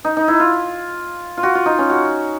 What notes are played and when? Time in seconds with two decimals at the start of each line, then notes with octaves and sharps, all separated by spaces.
0.05 D#4
0.17 D#4
0.28 E4
0.40 F4
1.37 F4
1.43 F#4
1.55 F4
1.66 D#4
1.79 C#4
1.90 F#4